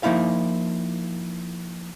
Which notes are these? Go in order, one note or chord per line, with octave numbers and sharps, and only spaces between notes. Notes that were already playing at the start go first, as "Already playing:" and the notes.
F3 A#3 D#4 E4 F5